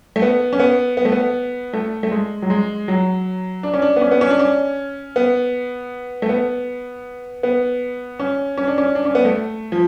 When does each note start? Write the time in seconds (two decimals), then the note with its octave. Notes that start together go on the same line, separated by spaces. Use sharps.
0.16 A3
0.22 B3
0.53 C#4
0.59 B3
0.97 B3
1.05 A3
1.12 B3
1.73 A3
2.03 A3
2.12 G#3
2.42 F#3
2.50 G#3
2.88 F#3
3.63 D4
3.74 C#4
3.82 D4
3.96 B3
4.01 C#4
4.11 B3
4.21 C#4
4.30 D4
4.39 C#4
5.16 B3
6.22 A3
6.29 B3
7.43 B3
8.20 C#4
8.58 C#4
8.67 D4
8.78 C#4
8.95 D4
9.05 C#4
9.15 B3
9.25 A3
9.72 F3